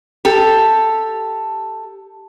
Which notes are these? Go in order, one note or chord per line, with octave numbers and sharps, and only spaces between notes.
G4 A4